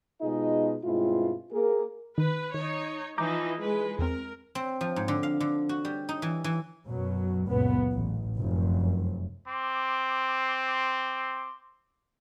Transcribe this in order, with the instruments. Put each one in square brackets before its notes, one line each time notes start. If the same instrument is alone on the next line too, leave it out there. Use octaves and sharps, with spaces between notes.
[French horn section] B2 G#3 D#4 F4 G#4 D#5
G2 B2 G#3 C4 E4 F4
A#3 G#4 A#4
[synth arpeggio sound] D#3 [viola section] B4
[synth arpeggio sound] D#3 [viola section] D#4 C#5
[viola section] E3 F3 D#4 [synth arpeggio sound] A#5 D6 G6
[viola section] G#3 B4
[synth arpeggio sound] E2 C4 [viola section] A#4
[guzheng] C4
F3
G#2
D3
F5
D3
F#4
G3
D#4
E3
E3
[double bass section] F#2 B2 F#3
C#2 F#2 A#2 B3
A1
F1 F#2
[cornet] C4 [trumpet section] C6 D6